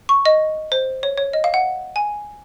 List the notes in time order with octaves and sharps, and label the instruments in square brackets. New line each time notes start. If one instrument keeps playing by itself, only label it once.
[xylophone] C#6
D#5
C5
C#5
C#5
D#5
F5
F#5
G#5